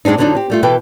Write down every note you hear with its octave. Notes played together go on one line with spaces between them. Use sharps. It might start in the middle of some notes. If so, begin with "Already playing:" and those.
G2 G#3 C4 D4 D#4
F2 D3 F#3 G#3 D4 D#4
C4 G4
G3 A3 F4
B2 E3 A4 B4 G5